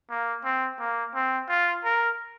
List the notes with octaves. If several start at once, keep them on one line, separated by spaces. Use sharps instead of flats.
A#3
C4
A#3
C4
F4
A#4